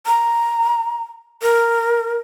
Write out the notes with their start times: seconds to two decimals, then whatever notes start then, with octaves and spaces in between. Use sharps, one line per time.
0.06 A#5
1.42 A#4